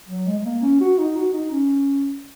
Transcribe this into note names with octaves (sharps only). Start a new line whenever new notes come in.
F#3
G#3
G#3
A#3
C#4
F#4
D#4
F#4
D#4
C#4